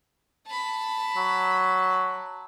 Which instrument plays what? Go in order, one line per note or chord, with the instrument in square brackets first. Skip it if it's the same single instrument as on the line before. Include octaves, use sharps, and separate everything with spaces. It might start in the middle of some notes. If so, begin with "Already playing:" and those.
[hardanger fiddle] A5 B5
[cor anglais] F#3